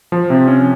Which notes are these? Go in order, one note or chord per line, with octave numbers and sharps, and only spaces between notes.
F3
C3
C#4